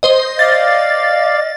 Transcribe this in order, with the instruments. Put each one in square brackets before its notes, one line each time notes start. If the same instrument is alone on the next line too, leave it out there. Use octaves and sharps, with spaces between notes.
[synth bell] C5 D#5
[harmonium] D5 F5 [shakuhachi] D#5 [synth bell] A6